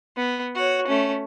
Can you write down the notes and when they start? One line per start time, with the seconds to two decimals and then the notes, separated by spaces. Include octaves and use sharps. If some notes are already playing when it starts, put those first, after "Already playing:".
0.17 B3
0.55 F#4 C#5
0.87 A3 C#4